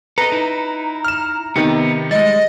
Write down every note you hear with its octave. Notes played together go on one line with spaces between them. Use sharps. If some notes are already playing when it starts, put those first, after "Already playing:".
A4 B4 D#5 A#5
D#4 E4
F6 E7
C3 D#3 B3 D#4
G3 G#3 D#5 A6